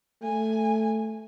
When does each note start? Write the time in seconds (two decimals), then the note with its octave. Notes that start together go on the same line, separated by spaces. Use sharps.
0.23 A3 G#5